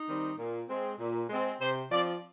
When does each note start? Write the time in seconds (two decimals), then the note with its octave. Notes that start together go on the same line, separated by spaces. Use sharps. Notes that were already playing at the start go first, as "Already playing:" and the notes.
Already playing: D#4
0.08 D#3 G3 C4
0.38 A#2
0.69 G#3 C4
0.99 A#2
1.30 G#3 C4
1.60 C3 C5
1.91 F3 C4 D5